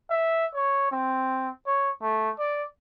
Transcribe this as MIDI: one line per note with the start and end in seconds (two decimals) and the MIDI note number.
0.10 0.46 76
0.54 0.89 73
0.91 1.49 60
1.67 1.90 73
2.02 2.31 57
2.39 2.64 74